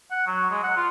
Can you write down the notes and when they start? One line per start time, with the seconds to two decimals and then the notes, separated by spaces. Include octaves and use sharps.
0.11 F#5
0.27 F#3
0.50 G#3
0.63 F#5
0.76 F4